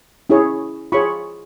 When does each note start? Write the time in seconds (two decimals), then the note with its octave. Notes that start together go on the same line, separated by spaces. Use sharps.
0.30 C#4 E4 G#4 C#5
0.92 F4 G#4 C#5 B5 C#6